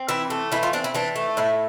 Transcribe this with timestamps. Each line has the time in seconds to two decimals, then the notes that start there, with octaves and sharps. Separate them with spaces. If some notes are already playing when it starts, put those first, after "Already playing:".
Already playing: C4
0.09 E3 E4
0.30 A3
0.52 E3 E4
0.63 F4
0.73 C4 D4
0.84 E4
0.95 E3 D4
1.16 A3
1.37 A2 E4